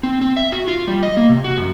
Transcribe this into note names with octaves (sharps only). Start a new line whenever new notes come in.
C4
C4
E5
F#4
F4
G3
D#5
A#3
C3
F#4
F#2